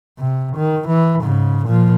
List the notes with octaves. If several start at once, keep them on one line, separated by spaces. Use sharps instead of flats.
C3
D#3
E3
G#2 C#3
A#2 F3